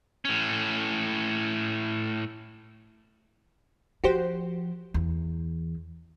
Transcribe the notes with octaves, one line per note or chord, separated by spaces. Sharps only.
A2 C#4
F3 F#4 G4 C5
E2